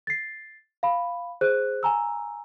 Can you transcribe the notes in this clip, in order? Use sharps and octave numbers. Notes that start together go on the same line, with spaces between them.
A6 C7
F5 B5
G#4 C5 F#6
G#5 A#5 E6